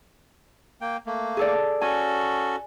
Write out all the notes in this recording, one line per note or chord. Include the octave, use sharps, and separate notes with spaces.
A#3 G5
A3 A#3
G#4 A4 D5
C#4 F#4 A4 G#5